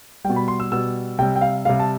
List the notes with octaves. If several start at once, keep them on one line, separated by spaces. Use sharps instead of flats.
B2 G3 G5
B5
C6
E6
B2 G3 E6
C3 G3 G5
G5
F5
C3 G3 F5
A5